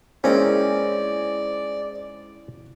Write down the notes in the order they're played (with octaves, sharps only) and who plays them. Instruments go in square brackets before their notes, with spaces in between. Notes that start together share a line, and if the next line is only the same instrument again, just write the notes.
[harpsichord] G#2 C4 [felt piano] A#3 E4 C5 [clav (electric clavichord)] C#4 [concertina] D5